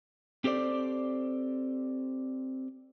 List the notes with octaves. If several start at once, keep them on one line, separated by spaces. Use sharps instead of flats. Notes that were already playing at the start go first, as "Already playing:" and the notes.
C4 G4 A4 C5 D5